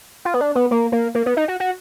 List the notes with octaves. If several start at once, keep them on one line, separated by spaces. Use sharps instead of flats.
F4
B3
D4
B3
A#3
A#3
A#3
B3
D#4
F#4
F#4